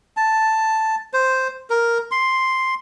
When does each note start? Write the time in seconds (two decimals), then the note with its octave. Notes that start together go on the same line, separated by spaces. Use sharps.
0.17 A5
1.13 C5
1.70 A#4
2.11 C6